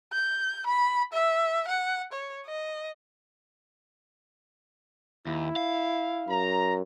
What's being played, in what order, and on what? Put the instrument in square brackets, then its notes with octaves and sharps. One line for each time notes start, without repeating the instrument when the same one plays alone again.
[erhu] G6
B5
E5
F#5
C#5
D#5
[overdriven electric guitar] D#2 [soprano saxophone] E4
[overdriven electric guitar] F5
[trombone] F#2 [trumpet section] A#5